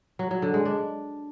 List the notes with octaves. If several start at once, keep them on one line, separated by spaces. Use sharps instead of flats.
F#3
F#3
D3
G#3
D4